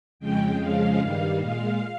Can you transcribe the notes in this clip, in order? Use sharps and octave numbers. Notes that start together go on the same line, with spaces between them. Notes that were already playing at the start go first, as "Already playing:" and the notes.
F2 C#3 G#3 G5
F2 C#3 F3 G#3 F5
G2 D#3 G3
A#2 G#3 F5